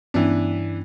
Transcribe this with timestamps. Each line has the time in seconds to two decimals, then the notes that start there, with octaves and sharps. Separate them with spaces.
0.14 G2 E3 B3 C#4 D4